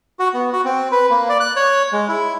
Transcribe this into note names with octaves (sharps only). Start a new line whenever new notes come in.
F#4
B3
F#4
C4
B4
A#3
D5
F#6
C#5
G#3
E4